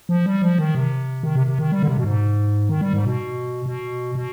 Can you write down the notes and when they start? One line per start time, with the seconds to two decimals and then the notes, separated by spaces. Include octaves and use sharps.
0.09 F3
0.26 G3
0.42 F3
0.58 D#3
0.75 C3
1.23 D#3
1.36 C3
1.47 C3
1.59 D#3
1.72 G3
1.83 D3
1.88 C3
1.97 B2
2.04 G#2
2.69 D#3
2.81 G3
2.93 G#2
3.05 B2
3.66 B2
4.15 B2